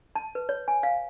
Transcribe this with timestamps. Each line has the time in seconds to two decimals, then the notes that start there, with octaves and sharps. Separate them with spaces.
0.16 A5
0.35 B4
0.49 C#5
0.68 G#5
0.83 F5